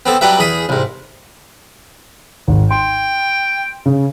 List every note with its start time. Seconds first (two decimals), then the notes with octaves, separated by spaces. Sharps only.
0.06 B3 C4 A4
0.21 F#3 G3 D4 G4 B4 E5
0.39 E2 G#4 B5 D#6
0.69 C2 G#2
2.48 G#1
2.71 G5 C6
3.86 C#3